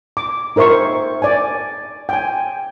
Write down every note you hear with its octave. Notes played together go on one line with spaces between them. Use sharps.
D6
D#4 A#4 C5 E5 C#6
D5 G#5
G5 G#5